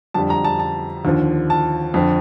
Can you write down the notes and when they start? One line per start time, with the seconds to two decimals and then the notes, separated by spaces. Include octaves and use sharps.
0.14 F2 D3 G3 A5
0.30 A#5
0.44 A5
0.59 A5
1.05 D#2 D3 F3
1.50 A5
1.94 F2 D3 F3